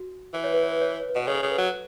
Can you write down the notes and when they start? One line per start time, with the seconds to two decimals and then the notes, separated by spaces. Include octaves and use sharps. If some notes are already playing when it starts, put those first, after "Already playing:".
Already playing: F#4
0.34 E3 B4
0.44 C#5
0.53 B4
0.63 C#5
0.72 B4
0.81 C#5
0.91 B4
1.00 C#5
1.09 B4
1.16 B2
1.27 C#3 A4 C#5
1.42 C#3 A4
1.51 B4
1.58 F#3